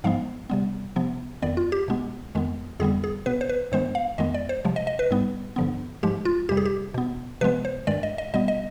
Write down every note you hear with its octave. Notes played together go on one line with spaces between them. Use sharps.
G#2 F3 G#3 B3 F5
C3 G3 B3
C3 F3 B3
F2 D#3 B3 D5
F4
G4
B2 G#3 B3
F2 D#3 G#3 B3
F2 D3 G3 B3 G#4
G#4
B2 B3 B4
C5
B4
G2 D#3 G#3 B3 C5
F5
F2 D#3 G#3 B3 D#5
D5
C5
C3 F3 G#3
D#5
D#5
B4
G#2 G3 B3
G2 D3 F3 B3
G#2 F3 G#3 G4
F4
F2 C3 G3 G4
G#4
G4
B2 B3
C3 F3 G#3 B3 B4
C5
G2 D#3 G#3 D5
D#5
D#5
B2 G3 B3 D#5
D#5